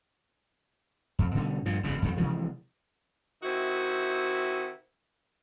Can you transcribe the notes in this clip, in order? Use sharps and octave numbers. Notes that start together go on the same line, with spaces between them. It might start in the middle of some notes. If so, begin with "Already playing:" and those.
F2
B2 D3 G3 C#4
G2 A#2 F3
F#1 E2 G#2 C#3
F2 D#3 G3
C3 E3 F3 G#3
C3 D#3 D#4 E4 F#4